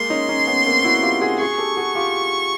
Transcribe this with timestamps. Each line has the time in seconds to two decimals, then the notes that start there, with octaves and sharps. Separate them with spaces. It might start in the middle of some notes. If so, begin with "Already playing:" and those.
Already playing: G#3 A#3 C6
0.10 C#4 D#4
0.29 C#4 D#4
0.47 B3 C#4
0.66 A#3 C4
0.84 E4 F#4
1.03 F4 G4
1.21 F#4 G#4
1.40 F#4 G#4 C#6
1.58 G4 A4
1.77 F#4 G#4
1.95 F4 G4